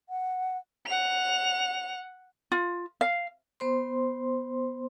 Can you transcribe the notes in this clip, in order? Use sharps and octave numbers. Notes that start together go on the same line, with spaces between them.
F#5
F#5 F7
F4
F5
B3 C5 C6